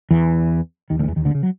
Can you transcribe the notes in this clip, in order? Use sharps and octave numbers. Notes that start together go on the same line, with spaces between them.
E2 E3
D#2 D#3
D2 D3
D#3
E2 E3
D#2 D#3
D2 D3
C#3
F#3